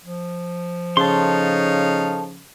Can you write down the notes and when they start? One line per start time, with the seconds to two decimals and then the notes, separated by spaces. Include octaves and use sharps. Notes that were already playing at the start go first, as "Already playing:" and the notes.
0.05 F3
0.97 C#3 D#4 A4 C#5 F5 C6